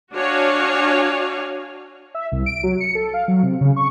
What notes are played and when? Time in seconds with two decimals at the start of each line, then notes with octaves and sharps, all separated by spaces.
0.16 D4 F#4 C#5 F5 G#5
2.15 E5
2.32 C2
2.46 D7
2.63 F#3
2.80 C#7
2.95 A4
3.14 F5
3.28 F#3
3.43 C3
3.61 C#3
3.76 C#6